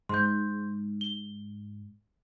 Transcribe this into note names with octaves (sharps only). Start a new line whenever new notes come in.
G#2 C6 G6
G7